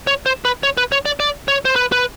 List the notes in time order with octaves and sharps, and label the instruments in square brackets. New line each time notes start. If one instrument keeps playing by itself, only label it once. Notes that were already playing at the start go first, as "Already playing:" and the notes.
[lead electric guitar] C#5
C5
B4
C#5
B4
C#5
D5
D5
C#5
C5
B4
B4